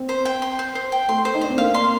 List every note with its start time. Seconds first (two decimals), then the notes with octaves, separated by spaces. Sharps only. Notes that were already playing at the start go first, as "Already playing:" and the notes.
Already playing: C4
0.09 C5
0.25 G5
0.42 C6
0.59 C5
0.75 C5
0.92 G5
1.08 A3 C6
1.25 C5
1.35 D#4
1.41 D4 C5
1.50 C4
1.58 A#3 F5
1.74 C6